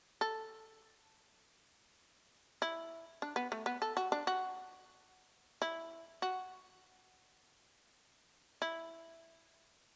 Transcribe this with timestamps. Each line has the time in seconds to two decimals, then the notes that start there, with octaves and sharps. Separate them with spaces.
0.21 A4
2.62 E4
3.22 D4
3.36 B3
3.52 A3
3.66 B3
3.82 A4
3.97 F#4
4.12 D4
4.27 F#4
5.62 E4
6.22 F#4
8.62 E4